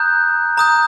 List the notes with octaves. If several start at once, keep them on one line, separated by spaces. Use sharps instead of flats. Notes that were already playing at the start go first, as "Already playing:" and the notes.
Already playing: A#5 D#6 F#6 G6
A#5 D#6 G6